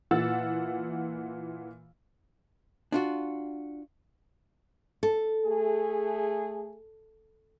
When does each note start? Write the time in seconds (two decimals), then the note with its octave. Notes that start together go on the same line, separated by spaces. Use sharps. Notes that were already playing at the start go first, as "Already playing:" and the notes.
0.11 A#2 E3 F#5 E6 A6
2.92 D4 F4 F#4
5.03 A4
5.45 A3 G#4